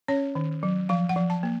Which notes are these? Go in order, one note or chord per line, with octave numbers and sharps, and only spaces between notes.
C#4 C#5
D#3
F#3
F3 F5
F#5
F3
A5
A#3